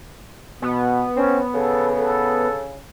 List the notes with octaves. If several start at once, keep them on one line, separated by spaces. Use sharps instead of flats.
B2 B3
C4 C#4
C#3 A4
A4